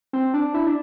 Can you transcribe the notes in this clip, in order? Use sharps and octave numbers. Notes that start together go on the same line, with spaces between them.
C4
D4
E4
D4